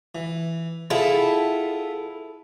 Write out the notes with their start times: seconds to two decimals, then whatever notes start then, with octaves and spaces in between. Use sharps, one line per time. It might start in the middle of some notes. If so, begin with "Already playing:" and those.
0.15 E3
0.90 B3 E4 F4 G#4 A4